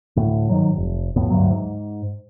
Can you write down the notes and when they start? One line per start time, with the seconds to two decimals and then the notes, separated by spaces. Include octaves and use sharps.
0.16 D2 A2
0.49 G#2 D#3 F#3
0.77 F1
1.16 B1 F2 A2 B3
1.30 D2 G2 F#3
1.50 G#2